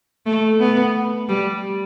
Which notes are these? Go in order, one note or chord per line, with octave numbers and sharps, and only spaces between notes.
A3
B3
G3